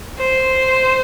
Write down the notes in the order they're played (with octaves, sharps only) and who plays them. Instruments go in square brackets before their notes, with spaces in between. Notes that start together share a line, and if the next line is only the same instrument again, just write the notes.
[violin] C5